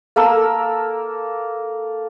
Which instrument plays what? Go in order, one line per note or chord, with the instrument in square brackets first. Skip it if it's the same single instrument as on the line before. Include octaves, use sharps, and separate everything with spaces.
[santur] A#3 A4 A#4 E6